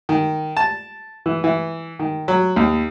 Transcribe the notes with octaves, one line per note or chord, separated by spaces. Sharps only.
D#3
A5
E3
E3
D#3
F#3
D#2